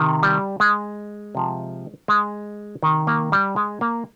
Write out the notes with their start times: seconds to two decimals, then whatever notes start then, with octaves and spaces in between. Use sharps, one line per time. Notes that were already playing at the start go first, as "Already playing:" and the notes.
Already playing: C3 D#3
0.23 G3
0.60 G#3
1.35 C3 F3
2.08 G#3
2.83 C3 D#3
3.07 A#3
3.32 G3
3.56 G#3
3.81 A#3